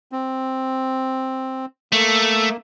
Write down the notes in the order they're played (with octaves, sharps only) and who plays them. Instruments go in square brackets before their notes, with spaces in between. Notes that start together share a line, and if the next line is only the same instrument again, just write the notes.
[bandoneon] C4
[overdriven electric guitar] A3 [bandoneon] A#3